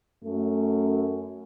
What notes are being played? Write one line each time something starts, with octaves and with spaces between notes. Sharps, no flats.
F#2 A3